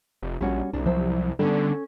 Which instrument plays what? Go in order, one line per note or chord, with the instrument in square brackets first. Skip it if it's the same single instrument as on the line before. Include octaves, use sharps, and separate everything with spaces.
[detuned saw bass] F1
[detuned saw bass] A#1 [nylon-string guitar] G3 C#4 F#4
[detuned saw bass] C2 [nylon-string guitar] A#3 D4
[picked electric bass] F3 F#3 [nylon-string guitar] C5 E5
[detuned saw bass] D3 [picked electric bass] G3 B3 [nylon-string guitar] C#4 A4